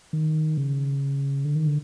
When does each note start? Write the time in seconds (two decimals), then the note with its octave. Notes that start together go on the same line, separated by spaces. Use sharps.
0.13 D#3
0.57 C#3
1.45 D3
1.55 D#3
1.67 D3